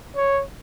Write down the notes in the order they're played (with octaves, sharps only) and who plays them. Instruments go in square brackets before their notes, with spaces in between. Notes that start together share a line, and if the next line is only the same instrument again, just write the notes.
[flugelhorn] C#5